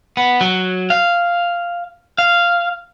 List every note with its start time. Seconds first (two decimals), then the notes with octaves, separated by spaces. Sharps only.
0.17 B3
0.41 F#3
0.90 F5
2.18 F5